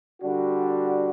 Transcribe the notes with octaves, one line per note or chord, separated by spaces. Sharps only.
D3 G3 D4 F#4